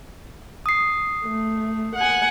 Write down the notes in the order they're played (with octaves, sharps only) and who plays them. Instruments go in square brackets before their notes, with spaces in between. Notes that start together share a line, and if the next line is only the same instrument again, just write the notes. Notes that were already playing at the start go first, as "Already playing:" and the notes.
[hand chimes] D#6 C7
[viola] A3
F#5 G#5